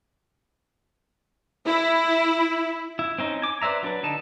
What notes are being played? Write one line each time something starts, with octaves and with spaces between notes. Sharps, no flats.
E4
E4
C4 C#4 D#4
G#5 D6
B4 C5 D5 E5 A#5
F#3 D4 B4
D3 D#4 A5